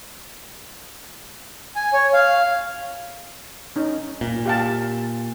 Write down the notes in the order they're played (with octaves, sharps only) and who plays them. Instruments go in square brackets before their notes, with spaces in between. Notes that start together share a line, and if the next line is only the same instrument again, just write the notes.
[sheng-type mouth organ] G#5
C#5
F5
[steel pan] C#4 D#4
[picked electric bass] A#2
[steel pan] G4 F5 A5